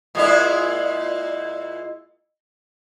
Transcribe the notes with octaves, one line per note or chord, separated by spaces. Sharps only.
A#2 G#3 E4